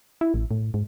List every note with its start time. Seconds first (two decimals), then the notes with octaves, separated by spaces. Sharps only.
0.21 E4
0.34 A1
0.51 A2
0.74 G#2